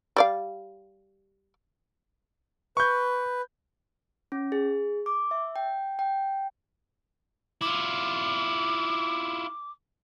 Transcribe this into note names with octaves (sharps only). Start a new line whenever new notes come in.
G3 D5 F5
B4 C#6 G6
C#4
G#4
D6
E5
G5
G5
E4 F4 D6